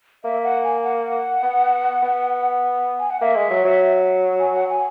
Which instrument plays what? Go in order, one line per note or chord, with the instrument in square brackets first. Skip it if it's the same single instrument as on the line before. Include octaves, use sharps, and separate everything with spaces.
[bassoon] A#3 [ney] E5
[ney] F#5
G#5
F#5
[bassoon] B3
B3
[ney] G#5
F#5
[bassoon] A#3 [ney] E5
[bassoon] G#3
F#3
F#3
[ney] G#5
F#5
G#5